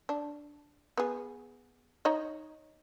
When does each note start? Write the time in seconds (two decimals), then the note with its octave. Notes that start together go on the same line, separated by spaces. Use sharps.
0.09 D4
0.97 B3 G#4
2.05 D#4 C#5 D#5